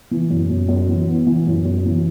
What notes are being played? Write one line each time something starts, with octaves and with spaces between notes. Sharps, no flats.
E3
F#2
F#2
F#2
E3
B3
E3
F#2
F#2
E3